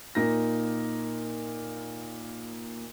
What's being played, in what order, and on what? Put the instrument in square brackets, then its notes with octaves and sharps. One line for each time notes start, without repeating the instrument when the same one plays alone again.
[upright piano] A#2 D#4 A#4 A#6